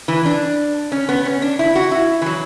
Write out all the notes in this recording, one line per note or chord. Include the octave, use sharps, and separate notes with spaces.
E3
D4
C#4
B3
C#4
D4
E4
F#4
E4
E3
F#3